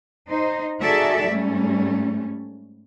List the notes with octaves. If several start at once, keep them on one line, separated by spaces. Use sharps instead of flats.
D#4 C5
D#4 F#4 G#4 A4 D5 E5
G#2 G3 A3 C#4